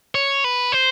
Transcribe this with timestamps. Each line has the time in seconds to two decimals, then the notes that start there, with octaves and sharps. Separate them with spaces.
0.15 C#5
0.44 B4
0.72 C5